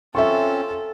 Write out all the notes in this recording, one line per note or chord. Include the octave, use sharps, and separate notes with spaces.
C4 C#4 F4 A4 E5 C#6